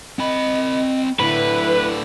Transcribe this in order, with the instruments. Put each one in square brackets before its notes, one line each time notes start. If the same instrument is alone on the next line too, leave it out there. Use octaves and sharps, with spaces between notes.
[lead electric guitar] C4 B5 [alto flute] D#5
[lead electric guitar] A2 D3 [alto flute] E4 [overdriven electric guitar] B4